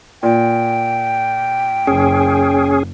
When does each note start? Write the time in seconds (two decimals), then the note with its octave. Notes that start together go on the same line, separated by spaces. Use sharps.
0.23 A#2 G5
1.87 F#1 C#4 G#4